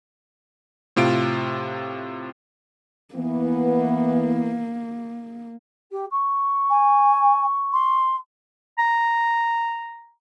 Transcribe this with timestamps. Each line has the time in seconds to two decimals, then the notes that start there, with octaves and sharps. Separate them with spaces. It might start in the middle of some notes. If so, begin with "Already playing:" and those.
0.96 A2 C3 F4 D7
3.15 E3 A#3 B3
5.91 G4
6.11 C#6
6.70 G#5
7.73 C6
8.79 A#5